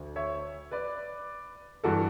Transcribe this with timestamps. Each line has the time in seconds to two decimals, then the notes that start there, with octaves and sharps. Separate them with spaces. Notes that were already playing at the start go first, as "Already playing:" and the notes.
Already playing: D2 D3
0.16 C#5 E5
0.71 B4 D5
1.83 G2 E3 F#4 A4